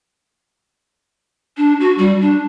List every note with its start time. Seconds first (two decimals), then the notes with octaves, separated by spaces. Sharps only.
1.57 D4
1.80 F#4
1.98 G3
2.21 D4